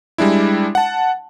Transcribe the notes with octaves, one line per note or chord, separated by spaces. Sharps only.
G3 G#3 D4 E4
F#5 A5